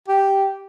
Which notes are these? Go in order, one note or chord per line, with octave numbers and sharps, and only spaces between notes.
G4